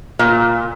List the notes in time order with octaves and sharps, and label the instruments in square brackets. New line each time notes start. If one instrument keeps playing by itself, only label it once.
[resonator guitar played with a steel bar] A#2